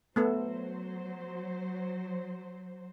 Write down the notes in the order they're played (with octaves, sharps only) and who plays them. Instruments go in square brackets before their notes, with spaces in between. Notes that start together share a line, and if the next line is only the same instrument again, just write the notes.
[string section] F#3 C5 [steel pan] A3 B3 A4